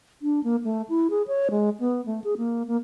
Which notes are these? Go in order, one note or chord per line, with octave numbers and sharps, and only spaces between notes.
D4
A#3
A3
E4
G#4
C#5
G#3
B3
A3
G#4
A#3
A#3